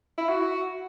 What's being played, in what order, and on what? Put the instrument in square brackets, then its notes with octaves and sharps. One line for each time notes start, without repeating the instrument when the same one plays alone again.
[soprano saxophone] E4
F#4